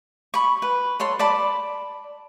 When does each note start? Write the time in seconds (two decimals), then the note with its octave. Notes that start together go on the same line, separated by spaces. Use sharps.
0.34 B5 C#6
0.62 B4
1.00 A4 C#5 C6
1.19 D5 A5 B5